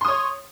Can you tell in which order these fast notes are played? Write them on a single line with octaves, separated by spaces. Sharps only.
C6 D#6 C#5